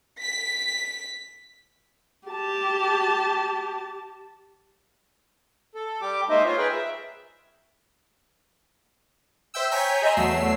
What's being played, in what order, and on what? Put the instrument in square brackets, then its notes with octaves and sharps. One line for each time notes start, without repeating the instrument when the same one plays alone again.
[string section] B6
[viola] G4 A5
[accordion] A4
G3 G4 D6
G#3 A#3 D#4 C5 D#5 E5
F4 C5 C#5
G#4 A#4 B4 G5
E5
[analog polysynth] C5 E5 G5 E6
C#5 G5 G#5 A#5 G6 B6
G#4 D#5 E5 A#5 C6
E2 F#3 A3 E6 C7